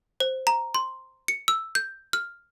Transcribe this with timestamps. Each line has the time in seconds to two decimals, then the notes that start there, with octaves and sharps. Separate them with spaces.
0.20 C5
0.47 A#5
0.75 C6
1.28 C#7
1.48 E6
1.75 G6
2.13 F6